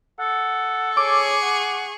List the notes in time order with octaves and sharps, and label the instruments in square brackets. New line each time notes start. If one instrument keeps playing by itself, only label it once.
[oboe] A4 [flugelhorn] F#5
[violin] G#4 C#6 [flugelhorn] C#5 [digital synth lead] D6
[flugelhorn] F#5